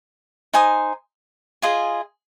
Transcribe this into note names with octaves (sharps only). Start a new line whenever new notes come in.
D#4 C5 G#5 D#6
F4 G#4 D#5 G#5